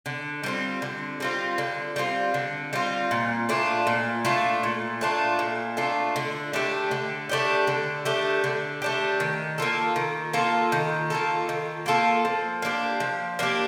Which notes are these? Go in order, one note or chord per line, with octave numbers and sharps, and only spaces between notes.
D3
G3 C4 F4
D3
G3 C4 F4
D3
G3 C4 F4
D3
G3 C4 F4
A#2
A3 D4 F4
A#2
A3 D4 F4
A#2
A3 D4 F4
A#2
A3 D4 F4
D3
A3 D4 G4
D3
A3 D4 G4
D3
A3 D4 G4
D3
A3 D4 G4
D#3
A#3 F4 A4
D#3
A#3 F4 A4
D#3
A#3 F4 A4
D#3
A#3 F4 A4
F3
A#3 D4 G4
F3
A#3 D4 G4